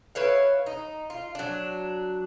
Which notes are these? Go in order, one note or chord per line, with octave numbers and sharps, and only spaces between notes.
E4 B4 C#5 F5
D#4
F4
F#3 D4